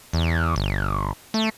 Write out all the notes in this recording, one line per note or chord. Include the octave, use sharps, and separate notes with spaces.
E2
G1
A3